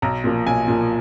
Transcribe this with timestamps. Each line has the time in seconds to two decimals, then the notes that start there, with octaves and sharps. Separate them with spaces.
0.02 B1 A#5
0.24 A#2 F3
0.47 B1 G#5
0.68 A#2 F3